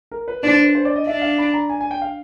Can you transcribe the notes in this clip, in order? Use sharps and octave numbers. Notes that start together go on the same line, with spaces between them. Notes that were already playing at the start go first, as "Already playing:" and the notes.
A#4
B4
D4 C5
C5
B4
C5
D5
D#5
D4 E5
F5
B5
A#5
G#5
G#5
G5
F5